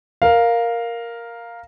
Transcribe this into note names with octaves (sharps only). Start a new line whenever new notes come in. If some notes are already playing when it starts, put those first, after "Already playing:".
A#4 F5